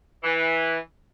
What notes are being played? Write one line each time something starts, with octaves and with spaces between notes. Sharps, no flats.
E3